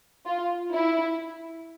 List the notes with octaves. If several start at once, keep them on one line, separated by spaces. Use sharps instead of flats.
F4
E4